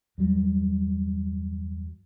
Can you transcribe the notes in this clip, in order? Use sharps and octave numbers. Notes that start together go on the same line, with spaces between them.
E2 G2 F#3 G3